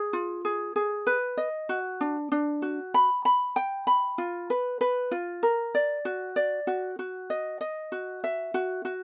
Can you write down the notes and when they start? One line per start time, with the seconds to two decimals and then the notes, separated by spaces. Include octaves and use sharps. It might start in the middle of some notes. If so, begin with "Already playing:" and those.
Already playing: G#4
0.13 F4
0.45 G#4
0.76 G#4
1.07 B4
1.37 D#5
1.69 F#4
2.01 D4
2.32 D4
2.62 F#4
2.94 B5
3.25 B5
3.56 G5
3.87 B5
4.18 F4
4.50 B4
4.81 B4
5.11 F4
5.43 A#4
5.75 D5
6.05 F#4
6.36 D5
6.67 F#4
6.99 F#4
7.30 D#5
7.61 D#5
7.92 F#4
8.24 E5
8.54 F#4
8.85 F#4